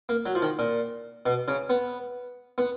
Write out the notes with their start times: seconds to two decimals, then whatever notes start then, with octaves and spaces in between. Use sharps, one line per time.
0.09 A#3
0.26 F#3
0.35 F3
0.42 D#3
0.59 A#2
1.26 B2
1.48 C#3
1.70 B3
2.58 B3